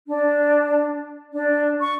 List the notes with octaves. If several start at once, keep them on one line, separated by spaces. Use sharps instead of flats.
D4
D4
C#6